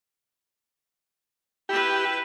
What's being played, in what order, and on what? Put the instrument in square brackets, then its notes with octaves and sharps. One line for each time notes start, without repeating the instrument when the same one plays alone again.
[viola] E4 B4 [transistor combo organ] G4